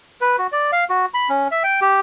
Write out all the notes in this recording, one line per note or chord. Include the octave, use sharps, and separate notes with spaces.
B4
F#4
D5
F5
F#4
B5
C#4
E5
G5
G4